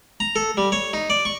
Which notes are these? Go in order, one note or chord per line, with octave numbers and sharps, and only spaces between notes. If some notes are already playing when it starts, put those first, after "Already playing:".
A#5
A4
G3
C#5
D#4
D5
C#6